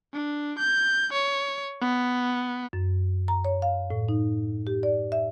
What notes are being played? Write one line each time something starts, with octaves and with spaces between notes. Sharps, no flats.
D4
G6
C#5
B3
F#2
A#5
C#5
F5
A2
D#4
G4
D5
E5